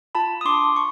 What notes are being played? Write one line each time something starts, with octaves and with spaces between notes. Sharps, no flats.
F4 A5 B5
D#6
D4 C6 D6
C#6